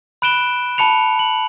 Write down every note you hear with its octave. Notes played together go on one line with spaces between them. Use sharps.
B5 F#6 D7 E7 G7
A5 B5 C#7 F7
F#7